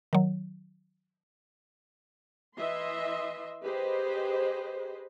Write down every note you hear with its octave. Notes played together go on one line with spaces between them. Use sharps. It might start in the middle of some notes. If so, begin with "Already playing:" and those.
D#3 F#3
E3 D#5 E5 C6
G4 G#4 B4 C5 D#5